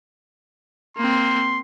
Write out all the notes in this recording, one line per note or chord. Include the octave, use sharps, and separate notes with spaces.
A#3 C4 C6